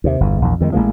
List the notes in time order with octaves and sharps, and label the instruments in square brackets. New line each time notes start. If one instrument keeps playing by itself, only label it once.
[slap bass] D#2 C3
G1 E2
A#1 E2
F2 D#3 F3 G#3
A1 F3 G#3 A#3